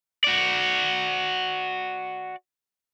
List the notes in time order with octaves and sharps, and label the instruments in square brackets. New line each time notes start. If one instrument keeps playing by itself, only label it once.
[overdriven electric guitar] F#4 D5